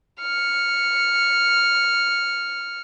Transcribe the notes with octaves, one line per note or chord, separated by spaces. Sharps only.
F6 C#7